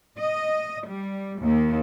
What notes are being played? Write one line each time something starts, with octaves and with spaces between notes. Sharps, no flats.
D#5
G3
D#2